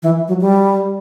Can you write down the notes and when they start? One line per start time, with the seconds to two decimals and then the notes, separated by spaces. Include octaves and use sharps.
0.03 E3
0.28 F#3
0.41 G3